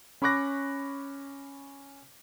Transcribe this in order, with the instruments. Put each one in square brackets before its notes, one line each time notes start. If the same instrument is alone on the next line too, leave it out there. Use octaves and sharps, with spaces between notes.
[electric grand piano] C#4 B5 C#6 D6 F#6 A#6